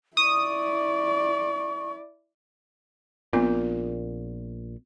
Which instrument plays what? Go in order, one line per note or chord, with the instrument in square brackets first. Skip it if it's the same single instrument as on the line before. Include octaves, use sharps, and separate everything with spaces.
[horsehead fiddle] E4 D5 [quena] C#6 [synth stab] D#6
[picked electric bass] A#1 A#2 [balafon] B3 C4 F4